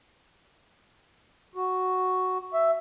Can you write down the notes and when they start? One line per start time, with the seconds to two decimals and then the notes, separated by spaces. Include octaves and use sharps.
1.55 F#4
2.54 E5